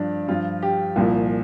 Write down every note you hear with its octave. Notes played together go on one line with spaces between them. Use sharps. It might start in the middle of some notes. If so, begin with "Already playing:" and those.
Already playing: G2 F3 D4
G2 F3 F4
G4
C2 A#2 F3